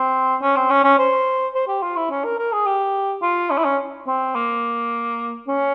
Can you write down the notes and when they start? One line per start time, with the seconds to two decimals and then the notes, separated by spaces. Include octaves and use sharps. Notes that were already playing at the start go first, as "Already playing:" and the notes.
Already playing: C4
0.42 C#4
0.56 C4
0.70 C#4
0.84 C#4
0.98 C5
1.54 C5
1.68 G4
1.82 F4
1.96 E4
2.11 C#4
2.25 A#4
2.38 A#4
2.52 G#4
2.66 G4
3.22 F4
3.51 C#4
3.58 E4
3.65 C#4
4.07 C4
4.35 A#3
5.48 C#4